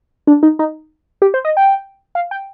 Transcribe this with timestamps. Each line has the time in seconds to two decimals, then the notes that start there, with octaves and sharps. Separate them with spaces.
0.27 D4
0.43 D#4
0.59 D#4
1.22 G4
1.34 C5
1.45 D#5
1.57 G5
2.15 F5
2.31 G5